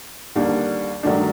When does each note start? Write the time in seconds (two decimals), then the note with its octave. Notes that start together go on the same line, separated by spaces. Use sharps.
0.36 D#2 D3 G3 A#3 D4
1.03 G2 D#3 F#3 A3 D4